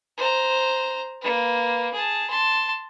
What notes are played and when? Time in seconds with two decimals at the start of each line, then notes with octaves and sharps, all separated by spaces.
0.18 C5 A#5
1.21 A#3 B4
1.94 G#4 A5
2.30 A5 C6